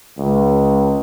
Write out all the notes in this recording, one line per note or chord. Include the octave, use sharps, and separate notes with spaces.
C#2